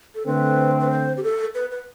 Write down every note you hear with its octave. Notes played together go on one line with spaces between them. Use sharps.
A4
D3 A3 C4 B4
B4
C5
G4
A4
B4
B4